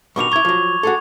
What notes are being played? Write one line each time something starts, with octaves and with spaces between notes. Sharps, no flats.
G2 B2 D#3 C#6 D6 F7
E4 A#5 C#6 G#6
F3 F#3
F#4 G#4 A4